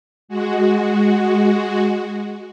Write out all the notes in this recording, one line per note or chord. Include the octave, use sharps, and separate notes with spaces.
G#3 F#4